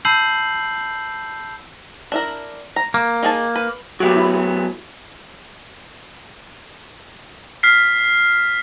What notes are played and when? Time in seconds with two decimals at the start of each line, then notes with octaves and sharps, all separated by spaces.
0.05 A5 B5 E6 G6 C7 F#7
2.12 D4 E4 A#4
2.76 A#5
2.94 A#3
3.23 D#4 G#4 A5
3.56 B4
4.00 F#3 A3 B3 F#4 G4
4.16 E4
7.63 F6 B6 C7